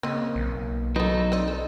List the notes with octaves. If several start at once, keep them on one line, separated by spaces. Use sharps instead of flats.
C#3 A#3 C4 D#5
B1
F#3 B3 D#4 A4
C4 D5 D#5
D#4 A4